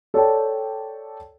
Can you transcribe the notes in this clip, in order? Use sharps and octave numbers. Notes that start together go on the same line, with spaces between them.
A4 C#5 D5 G5 A5